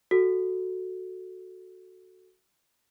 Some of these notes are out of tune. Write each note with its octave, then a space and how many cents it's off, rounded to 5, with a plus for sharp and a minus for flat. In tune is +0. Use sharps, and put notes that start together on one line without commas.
F#4 +0 A4 +0